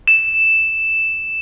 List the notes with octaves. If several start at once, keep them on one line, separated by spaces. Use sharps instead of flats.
E7